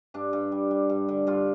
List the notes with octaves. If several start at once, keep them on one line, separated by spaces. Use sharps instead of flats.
G2 D4
G2
G3
G3
G2
D3
G2 F4